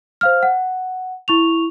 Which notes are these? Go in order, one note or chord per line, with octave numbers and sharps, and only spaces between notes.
C5 F5 F6
F#5
E4 C#6 F7